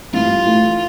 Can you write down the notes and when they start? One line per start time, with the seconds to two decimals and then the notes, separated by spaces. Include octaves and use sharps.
0.13 G2 E3 A3 E4 F4 G4
0.46 A2 E3 A3